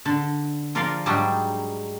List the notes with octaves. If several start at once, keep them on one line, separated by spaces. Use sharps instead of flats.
D3
F3 F4 A#4 D5 F5 C6
G#2 F#3 G3 D4 D#4 G4